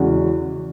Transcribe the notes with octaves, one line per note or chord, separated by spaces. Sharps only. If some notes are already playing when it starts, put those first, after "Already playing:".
Already playing: E2 C#3 G#3 C#4 F#4